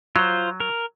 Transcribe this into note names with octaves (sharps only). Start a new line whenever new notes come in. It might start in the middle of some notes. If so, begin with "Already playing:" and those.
F#3 F4 C5
A#4